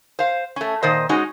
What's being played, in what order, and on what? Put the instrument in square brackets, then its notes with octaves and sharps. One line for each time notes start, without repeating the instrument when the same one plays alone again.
[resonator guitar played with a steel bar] C5 F5
A3 C#4
A#2 D#3 C5 D#5
G#3 C#4 D#4 F#4